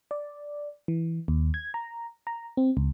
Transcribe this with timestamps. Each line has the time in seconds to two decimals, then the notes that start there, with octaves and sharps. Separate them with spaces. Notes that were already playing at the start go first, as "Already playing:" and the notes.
0.11 D5
0.88 E3
1.28 D#2
1.54 G#6
1.74 A#5
2.27 A#5
2.57 C4
2.77 C#2